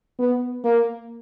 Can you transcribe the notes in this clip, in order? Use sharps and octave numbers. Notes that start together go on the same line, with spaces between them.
B3
A#3